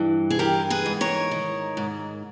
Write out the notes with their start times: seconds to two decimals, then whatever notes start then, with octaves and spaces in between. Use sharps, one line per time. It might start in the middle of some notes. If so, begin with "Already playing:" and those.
Already playing: G2 E3
0.30 G#4
0.39 E3 G4 A#4
0.70 G#4 B4
0.86 G#2
1.01 A#4 C#5
1.31 D#3
1.77 G#2